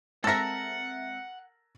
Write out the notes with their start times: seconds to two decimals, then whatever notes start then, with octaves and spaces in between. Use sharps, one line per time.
0.24 G#3 C4 A4 A#4 E5 F#5 A6 A#6